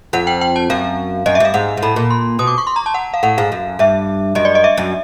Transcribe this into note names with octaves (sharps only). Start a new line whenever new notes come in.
F2 F#5
G5
G5
A5
F#2 F5
F#2 D#5
E5
G2 F5
G#2 F#5
G#2
A2 B5
A#2
C6
B2 D#6
D6
C#6
C6
A#5
A5
F#5
F5
A2 F#5
G#2 F5
F#2
G2 E5
F#2 D#5
D5
D#5
E5
F#2